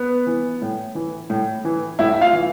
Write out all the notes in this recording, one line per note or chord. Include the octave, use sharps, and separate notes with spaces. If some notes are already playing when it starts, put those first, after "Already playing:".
Already playing: B3 B4
E3
A2
E3
A2
E3
A2 E4 E5
E5
F4 F5
E3